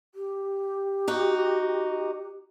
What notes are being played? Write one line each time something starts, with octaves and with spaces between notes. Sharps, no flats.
G4
D#4 F#4